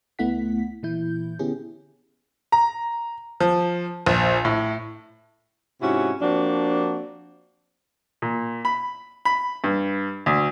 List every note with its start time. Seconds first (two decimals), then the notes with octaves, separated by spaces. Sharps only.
0.19 C#2 A3 B3 E4 F#5 B6
0.83 A#2 E3 E4 G6
1.39 D3 B3 C#4 E4 G4 G#4
2.52 A#5
3.40 F3
4.06 A#1
4.45 A2
5.82 G#2 C3 C#4 E4 F#4
6.21 F3 A#3 C4 D4 F#4
8.22 A#2
8.65 B5
9.25 B5
9.64 G2
10.26 D2